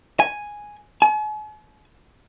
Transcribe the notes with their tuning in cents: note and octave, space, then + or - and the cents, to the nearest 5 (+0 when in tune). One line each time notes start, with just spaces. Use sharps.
G#5 +0
G#5 +45